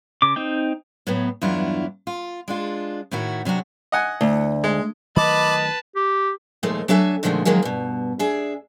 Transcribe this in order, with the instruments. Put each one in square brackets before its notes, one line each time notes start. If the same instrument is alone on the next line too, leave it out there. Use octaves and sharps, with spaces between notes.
[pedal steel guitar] C#3 D6
C4 D#4 G5
[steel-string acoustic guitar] A2 F#3 B3
E2 G2 F#3 D4 E4 F4
F4
G#3 D4 F4
A2 D#3 E4 F#4
C3 F#3 D4 F#4
[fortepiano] D#5 F#5 G#5
[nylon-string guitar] D2
[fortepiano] G#3
[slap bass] D#3 F#3 A3 [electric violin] B4 A5 [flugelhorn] D#5 [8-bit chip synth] B5 D6
[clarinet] G4
[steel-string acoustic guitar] D#2 A#2 F3 G#3 A3 D#4
F#3 D4 A4 E5 G#5
A#2 D3 D#3 F3 G#3 A3
D#3 F3 F#3 G#3 A#3
G2 B2
D4 G#4 E5